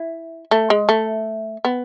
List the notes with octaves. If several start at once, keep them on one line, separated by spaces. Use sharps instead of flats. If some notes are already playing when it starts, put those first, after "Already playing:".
Already playing: E4
A3
G#3
A3
B3